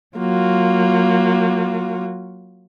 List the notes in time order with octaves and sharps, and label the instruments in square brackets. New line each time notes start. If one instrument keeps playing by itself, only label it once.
[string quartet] F#3 A#3 F4 F#4